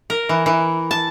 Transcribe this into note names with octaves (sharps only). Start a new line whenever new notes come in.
A#4
E3
E3
A5